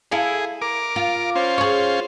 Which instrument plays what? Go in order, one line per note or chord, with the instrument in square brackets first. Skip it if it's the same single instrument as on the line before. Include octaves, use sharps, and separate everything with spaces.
[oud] E4 A4 F5 [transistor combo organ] G#4
[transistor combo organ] A#4 D6
[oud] F4
[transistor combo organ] C#4 F4 C5
[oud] G#4 C#5